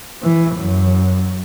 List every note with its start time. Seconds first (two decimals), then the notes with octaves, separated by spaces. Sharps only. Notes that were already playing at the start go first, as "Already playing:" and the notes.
0.23 E3
0.56 F#2